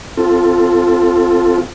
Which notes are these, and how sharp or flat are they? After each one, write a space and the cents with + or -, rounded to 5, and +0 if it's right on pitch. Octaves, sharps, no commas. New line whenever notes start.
C4 +0 F4 +0 A4 +0